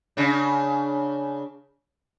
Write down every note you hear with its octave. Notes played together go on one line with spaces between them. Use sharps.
C#3 D4